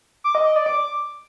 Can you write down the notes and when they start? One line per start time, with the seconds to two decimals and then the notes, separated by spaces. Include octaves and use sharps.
0.24 D6
0.35 D#5
0.45 D#5
0.56 D5
0.66 D6